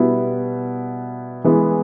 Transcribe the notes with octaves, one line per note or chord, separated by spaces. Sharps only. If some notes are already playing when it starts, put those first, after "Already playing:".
Already playing: B2 G3 B3 E4
E3 G#3 B3